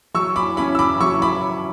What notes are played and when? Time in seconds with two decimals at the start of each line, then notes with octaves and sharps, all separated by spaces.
0.14 F#3 C#6 E6
0.36 B5 D6
0.57 C#4 E4 B5 D6
0.75 E6
0.79 B5 D6
1.01 F#3 C#6 E6
1.22 B5 D6